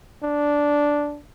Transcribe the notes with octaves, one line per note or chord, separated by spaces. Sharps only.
D4